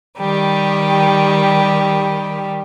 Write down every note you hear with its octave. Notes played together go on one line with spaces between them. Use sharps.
D#3 G3 G4